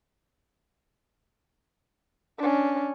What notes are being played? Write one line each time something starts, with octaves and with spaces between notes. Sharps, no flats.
C#4 D4